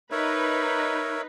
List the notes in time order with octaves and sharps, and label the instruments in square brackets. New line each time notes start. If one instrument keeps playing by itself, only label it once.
[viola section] D#4 B4 [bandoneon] A#4 C#5 E5